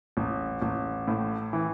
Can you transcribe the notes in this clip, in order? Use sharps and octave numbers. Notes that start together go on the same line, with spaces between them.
A1
A1
A2
E3